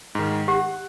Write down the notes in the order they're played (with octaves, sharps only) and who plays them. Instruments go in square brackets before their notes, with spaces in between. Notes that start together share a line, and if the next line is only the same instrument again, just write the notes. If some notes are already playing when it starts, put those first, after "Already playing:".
[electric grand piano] G#2 D#3
[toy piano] G4 [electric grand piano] F#5